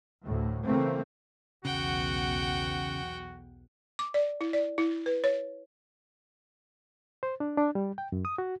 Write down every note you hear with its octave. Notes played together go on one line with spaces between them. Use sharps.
D2 A2
C#3 E3 A3 A#3 C4
B1 E2 C#3 F#4 F#5 G5
D6
D5
E4
D5
E4
B4
C#5
C5
D4
D4
G3
G5
F#2
D#6
F#4